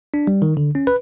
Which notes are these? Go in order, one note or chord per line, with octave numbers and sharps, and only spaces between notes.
D4
G3
D#3
D3
C#4
B4